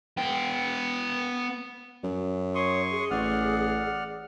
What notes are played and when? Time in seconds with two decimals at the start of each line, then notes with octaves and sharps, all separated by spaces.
0.17 B3 G5
2.04 F#2
2.55 C#5 C6 C#6 D#6
2.91 G#4
3.11 A1 D5 F#5 F6